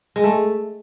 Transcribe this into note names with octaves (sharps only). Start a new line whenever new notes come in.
G#3
A3